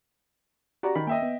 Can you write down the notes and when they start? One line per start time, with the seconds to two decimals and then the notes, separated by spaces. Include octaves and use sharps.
0.83 F#4 G4 D5 A#5
0.95 D#3 B5
1.07 A#3 D#5 E5 G5
1.22 B3